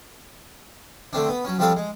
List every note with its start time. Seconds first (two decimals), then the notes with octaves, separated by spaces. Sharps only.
1.13 D3 A3 C4 D4
1.29 B3
1.45 F#3 C#4
1.59 F3 G3 C4 D4 A4 F5
1.76 G#3